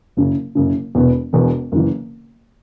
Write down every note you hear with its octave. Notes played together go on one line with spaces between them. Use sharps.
F#1 F#2 C#3
F#1 F#2 C#3
E1 E2 B2 B3
E1 E2 B2 B3
F#1 C#3 E3